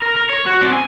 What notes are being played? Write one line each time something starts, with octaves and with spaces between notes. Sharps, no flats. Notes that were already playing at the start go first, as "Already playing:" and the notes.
A#4
A#4
C#5
F#4
C4 D5
G#5